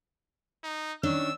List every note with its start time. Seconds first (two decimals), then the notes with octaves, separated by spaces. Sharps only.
0.64 D#4
1.03 D#3 C#4 D4 E6